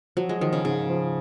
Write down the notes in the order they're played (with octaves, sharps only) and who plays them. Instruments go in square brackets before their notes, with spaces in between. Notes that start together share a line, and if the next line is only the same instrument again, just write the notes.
[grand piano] F3 [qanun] F#3
[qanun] G#3
[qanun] D#3 [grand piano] F3
[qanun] C#3
[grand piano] G#2 [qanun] C#3
[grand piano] F3